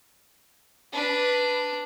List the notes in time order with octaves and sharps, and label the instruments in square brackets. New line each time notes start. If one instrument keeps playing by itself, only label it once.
[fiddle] D4 [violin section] B4